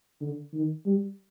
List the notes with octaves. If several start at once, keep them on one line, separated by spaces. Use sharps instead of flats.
D3
D#3
G3